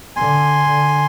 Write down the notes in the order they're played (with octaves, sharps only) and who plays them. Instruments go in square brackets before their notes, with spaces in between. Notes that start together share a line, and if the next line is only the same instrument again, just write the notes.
[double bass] D3 [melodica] G#5 C6
[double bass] D3